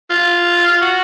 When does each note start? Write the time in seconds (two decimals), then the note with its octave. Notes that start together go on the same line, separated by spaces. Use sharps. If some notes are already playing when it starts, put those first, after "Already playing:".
0.10 F4
0.82 F#4